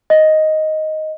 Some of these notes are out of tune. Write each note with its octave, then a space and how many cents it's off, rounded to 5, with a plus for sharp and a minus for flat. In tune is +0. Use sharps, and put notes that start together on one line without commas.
D#5 +5